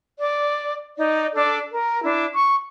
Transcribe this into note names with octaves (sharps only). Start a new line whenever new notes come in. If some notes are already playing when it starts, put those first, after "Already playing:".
D5
D#4 D5
D4 A4 D5
A#4
D4 E4
C#6